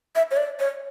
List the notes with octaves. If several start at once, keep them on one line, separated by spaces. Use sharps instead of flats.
E5
C#5
D5
C#5